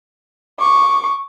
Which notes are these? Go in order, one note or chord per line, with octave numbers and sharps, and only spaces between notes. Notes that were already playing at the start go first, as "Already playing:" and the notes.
C#6 D6